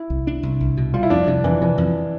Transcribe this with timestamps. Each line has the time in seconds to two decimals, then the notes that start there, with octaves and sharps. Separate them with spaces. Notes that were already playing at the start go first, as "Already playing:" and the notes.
Already playing: E4
0.10 C2
0.27 D4
0.43 C2
0.60 C2
0.77 B2
0.94 G3 F4
1.03 E4
1.10 F2 D4
1.27 C3 D4
1.44 F2 E3
1.61 C3 E3
1.78 F2